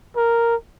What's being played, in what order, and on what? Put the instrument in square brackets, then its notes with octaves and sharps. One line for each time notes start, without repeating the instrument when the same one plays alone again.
[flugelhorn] A#4